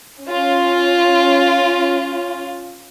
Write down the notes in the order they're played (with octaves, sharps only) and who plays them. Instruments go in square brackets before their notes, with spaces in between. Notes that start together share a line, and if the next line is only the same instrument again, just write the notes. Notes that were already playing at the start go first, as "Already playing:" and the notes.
[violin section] C#4 F4